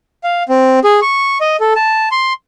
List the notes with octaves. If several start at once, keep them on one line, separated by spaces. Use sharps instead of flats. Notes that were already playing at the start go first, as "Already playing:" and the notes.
F5
C4
G#4
C#6
D#5
A4
A5
C6